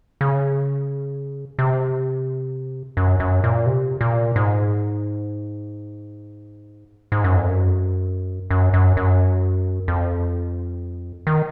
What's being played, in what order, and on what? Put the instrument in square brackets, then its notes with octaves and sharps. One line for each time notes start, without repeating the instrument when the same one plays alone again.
[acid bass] C#3
C3
F#2
F#2
A#2
C3
A#2
G#2
G#2
F#2
F2
F#2
F#2
F#2
F#2
F2
D#3